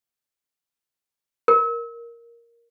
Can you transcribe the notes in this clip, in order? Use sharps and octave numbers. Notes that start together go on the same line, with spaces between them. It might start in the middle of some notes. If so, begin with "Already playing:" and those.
A#4